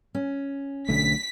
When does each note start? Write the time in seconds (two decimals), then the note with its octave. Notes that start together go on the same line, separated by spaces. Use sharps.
0.15 C#4
0.89 B1 D3 A3 B6